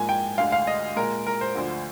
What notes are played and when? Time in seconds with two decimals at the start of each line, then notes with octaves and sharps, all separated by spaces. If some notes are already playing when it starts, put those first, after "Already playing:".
Already playing: G#2 F3 A#3 G#5
0.09 G5
0.38 D2 D3 G#3 F5
0.52 F5
0.67 D#5
0.96 A#2 G#3 A#4
1.27 A#4
1.41 C5
1.55 D2 D3 F3